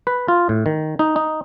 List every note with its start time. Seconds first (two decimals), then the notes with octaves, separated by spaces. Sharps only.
0.07 B4
0.28 F4
0.49 A2
0.66 D#3
0.99 D#4
1.16 D#4